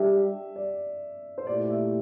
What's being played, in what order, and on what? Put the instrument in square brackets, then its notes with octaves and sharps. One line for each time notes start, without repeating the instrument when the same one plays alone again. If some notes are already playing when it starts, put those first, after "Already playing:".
Already playing: [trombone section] G3 D4 G4 [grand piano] E5
[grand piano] D5
C5
[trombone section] A#2 A3 E4 G4 [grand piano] D5
[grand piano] E5